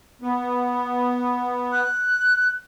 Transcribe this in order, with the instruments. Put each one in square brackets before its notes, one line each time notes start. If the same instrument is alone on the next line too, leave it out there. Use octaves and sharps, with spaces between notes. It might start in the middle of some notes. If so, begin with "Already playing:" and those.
[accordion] B3
[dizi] F#6